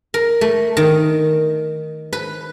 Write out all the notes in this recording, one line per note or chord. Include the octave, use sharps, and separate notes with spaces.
A#4
A3
D#3
B4